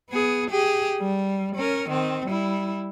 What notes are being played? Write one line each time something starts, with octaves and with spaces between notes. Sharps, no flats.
B3 G#4
G4 G#4
G3
C#4 A#4
D#3 C4
G3 E4